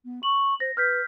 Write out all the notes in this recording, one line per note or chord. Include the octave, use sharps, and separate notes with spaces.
B3
C#6 F#7
C5 A#6
B4 F6 G6 B6